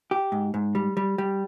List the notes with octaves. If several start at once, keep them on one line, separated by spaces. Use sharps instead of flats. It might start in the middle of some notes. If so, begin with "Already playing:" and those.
G4
G#2
G#2
G3
G3
G3